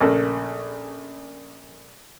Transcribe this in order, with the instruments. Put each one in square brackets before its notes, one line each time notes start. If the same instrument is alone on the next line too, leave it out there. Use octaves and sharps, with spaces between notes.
[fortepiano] A#1 C#3 A3 A4 A#4